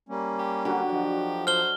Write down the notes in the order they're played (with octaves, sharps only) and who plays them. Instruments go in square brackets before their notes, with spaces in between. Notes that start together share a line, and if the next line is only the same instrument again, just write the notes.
[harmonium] G3 A#3 C#4
[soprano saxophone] G4
[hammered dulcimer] D3 F#3 F#4 [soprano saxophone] G4
[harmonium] F3 [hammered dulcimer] F#3 D#5
[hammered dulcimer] A4 [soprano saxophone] C5 [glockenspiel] F6 G7